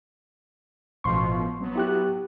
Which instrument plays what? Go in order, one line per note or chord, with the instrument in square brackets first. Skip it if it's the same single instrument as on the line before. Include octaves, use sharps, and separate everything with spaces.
[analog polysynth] A1 B2 F3 [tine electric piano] C6 C#6
[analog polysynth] F#3 B3
[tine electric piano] E4 G4 F#6